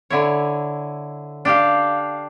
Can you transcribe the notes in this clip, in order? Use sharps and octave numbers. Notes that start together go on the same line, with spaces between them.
D3 E4 C#5
D4 G4 F5